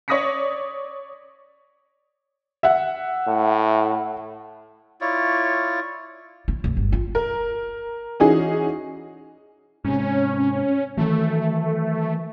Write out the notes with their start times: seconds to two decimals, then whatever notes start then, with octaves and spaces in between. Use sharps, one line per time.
0.08 C#5 D5 D#6 A#6 B6 C#7
2.63 E5 F#5
3.27 A2
5.01 E4 F4 C#5 D5
6.48 E4
6.64 D1
6.77 G1
6.92 F4
7.15 A#4
8.20 E3 C#4 D#4 F#4 G#4
9.85 G#2 C3 C#4
10.97 D#3 E3 F#3 A3